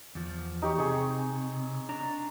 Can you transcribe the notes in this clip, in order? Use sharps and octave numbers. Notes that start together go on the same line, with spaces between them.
E2 F3
D#4 G4 C#5
C3 G#4 D#5 C#6
D4 A#5